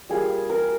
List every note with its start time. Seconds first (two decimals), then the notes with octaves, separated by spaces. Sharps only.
0.09 G3 A#3 F4 G#4
0.50 A#4